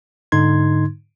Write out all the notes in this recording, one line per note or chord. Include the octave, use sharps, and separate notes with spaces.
G#2 D3 D#4 C6 G#6